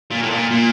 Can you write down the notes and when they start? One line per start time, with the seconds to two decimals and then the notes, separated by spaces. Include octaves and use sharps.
0.11 A#2
0.22 A2
0.30 A#2
0.51 A#2